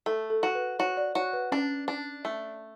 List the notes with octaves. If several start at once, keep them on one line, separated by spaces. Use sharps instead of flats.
A3 A4
A4
F#4
B4
F#4 C#5
D5
F#4 C#5
B4
C#4 D4
D4
A3